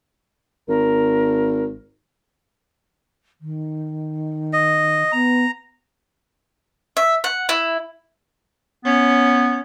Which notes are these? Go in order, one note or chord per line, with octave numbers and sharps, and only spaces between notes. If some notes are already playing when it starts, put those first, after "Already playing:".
G#1 A#4
D#3
D#5
B3 A#5
E5
F#5
E4
B3 C#4